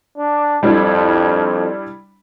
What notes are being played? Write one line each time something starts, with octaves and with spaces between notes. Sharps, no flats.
D4
F2 G3 D4 E4